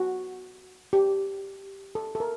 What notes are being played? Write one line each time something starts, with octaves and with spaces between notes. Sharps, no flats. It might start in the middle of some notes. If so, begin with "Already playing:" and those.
Already playing: F#4
G4
A4
A4
A#4